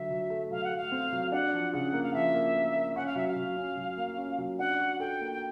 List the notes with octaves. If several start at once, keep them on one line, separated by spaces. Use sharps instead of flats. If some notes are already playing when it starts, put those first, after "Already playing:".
Already playing: D3 F#3 E5
F#3
A3
F#3 F5
F#5
A3
F5
C4
F#3
D4 F#5
F3
C#3 F#5
A#3
F5
F3 E5
A#3
A#3
A#3
C#4 F#5
F5
F#3 E5
F5
F#3
C#4
F#3
A#3
C#4
F#3
D4 F#5
F#4
A4 G5
A#3
G5